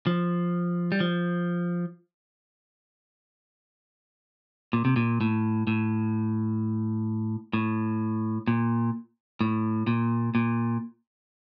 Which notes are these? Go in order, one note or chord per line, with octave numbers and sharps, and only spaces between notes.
F3
G3
F3
A#2
C3
A#2
A2
A2
A2
A#2
A2
A#2
A#2